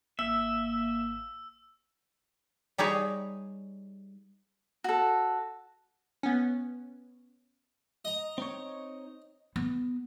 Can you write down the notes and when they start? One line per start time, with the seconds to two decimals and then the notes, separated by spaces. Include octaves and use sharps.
0.19 G#1 A#3 E5 E6
2.78 G3 D#4 G#4 C#5
4.84 F#4 A4
6.23 B3 C#4
8.05 D#5 A#5
8.38 C4 D#4 C#5
9.56 B3